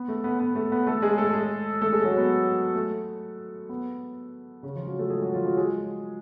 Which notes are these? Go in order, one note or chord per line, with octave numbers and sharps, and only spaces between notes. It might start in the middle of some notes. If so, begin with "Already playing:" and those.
Already playing: B3
A3
B3
B3
A3
B3
A3 A4
G#3 G#4
A3 A4
G#3 G#4
A3 A4
G#3 G#4
F#3 F#4
B3
A3
B3
C#3 C#4
F3 F4
F#3 F#4
A3 A4
G#3 G#4
F#3 F#4
F3 F4
F#3 F#4
G#3 G#4